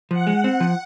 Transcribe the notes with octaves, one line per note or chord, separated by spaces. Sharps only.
F3 F#5
G#3
C4
F3